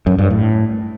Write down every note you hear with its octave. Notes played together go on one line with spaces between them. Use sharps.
F#2
G2
A2